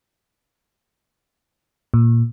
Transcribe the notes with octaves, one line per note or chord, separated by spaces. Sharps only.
A#2